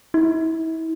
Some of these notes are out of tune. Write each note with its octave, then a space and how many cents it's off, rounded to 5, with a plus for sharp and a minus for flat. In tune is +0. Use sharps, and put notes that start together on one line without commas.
E4 -35